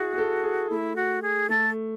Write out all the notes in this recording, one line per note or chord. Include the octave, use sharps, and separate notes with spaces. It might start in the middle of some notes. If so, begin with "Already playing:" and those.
Already playing: E4 F#4 G#4
G#4
A4
G#4
A3 E4
F#4
G#4
A3 A4